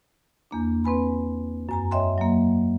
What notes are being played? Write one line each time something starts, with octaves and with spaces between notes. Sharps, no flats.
E2 A#3 D4
C4 B4 G#5 B5
F#2 G#5 A#5
C#5 D#5 E5 G5 C6
F#3 A#3